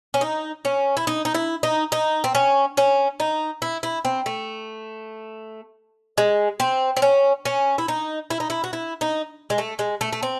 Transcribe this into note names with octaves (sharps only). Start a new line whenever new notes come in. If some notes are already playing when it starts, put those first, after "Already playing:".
C#4
D#4
C#4
E4
D#4
D#4
E4
D#4
D#4
C4
C#4
C#4
D#4
E4
E4
C4
A3
G#3
C4
C4
C#4
C#4
E4
D#4
E4
D#4
E4
F#4
E4
D#4
G#3
A3
G#3
A3
A3
C4